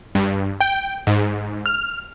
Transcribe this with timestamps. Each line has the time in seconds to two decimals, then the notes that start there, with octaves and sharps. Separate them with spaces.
0.15 G2
0.60 G5
1.07 G#2
1.66 F6